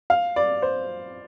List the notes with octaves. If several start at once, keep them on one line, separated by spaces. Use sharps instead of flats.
F5
D5
C5